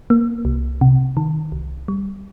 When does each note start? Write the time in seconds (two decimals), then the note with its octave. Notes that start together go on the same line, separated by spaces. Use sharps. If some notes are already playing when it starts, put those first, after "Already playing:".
0.10 A#3
0.45 C2
0.81 C3
1.17 D#3
1.52 C2
1.88 G3